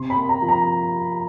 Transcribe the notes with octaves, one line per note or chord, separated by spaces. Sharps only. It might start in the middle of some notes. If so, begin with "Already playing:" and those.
Already playing: C3 C6
B5
A#3
A#5
F3
A#5